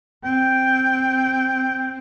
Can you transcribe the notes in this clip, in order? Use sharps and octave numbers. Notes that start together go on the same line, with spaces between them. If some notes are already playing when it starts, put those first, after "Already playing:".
C4 G5